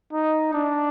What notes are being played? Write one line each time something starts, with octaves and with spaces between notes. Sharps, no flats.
D#4
D4